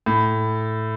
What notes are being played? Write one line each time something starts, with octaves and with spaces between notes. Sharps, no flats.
A2